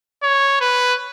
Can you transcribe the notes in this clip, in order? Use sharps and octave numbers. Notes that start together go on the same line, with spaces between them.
C#5
B4